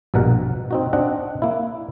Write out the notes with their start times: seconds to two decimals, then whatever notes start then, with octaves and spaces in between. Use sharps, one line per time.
0.14 A#1 G2 B2 A#4 F#5
0.71 C4 D#4 F#4
0.93 C4 D4 D#5 F#5
1.42 A#3 E4